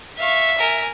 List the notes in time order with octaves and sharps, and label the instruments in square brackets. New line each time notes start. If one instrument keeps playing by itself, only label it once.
[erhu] E5 [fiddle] F5 C#6
[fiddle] A#4 G#5